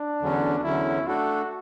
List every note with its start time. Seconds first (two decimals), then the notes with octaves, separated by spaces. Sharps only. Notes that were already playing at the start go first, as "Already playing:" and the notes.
Already playing: D4
0.21 E2 D3 F#3 C#4
0.64 E2 D3 F#3 C#4 E4
1.07 A3 D4 F#4 A4